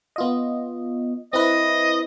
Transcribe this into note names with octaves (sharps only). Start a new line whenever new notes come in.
B3 F4 D#5
C4 E4 B4 D#5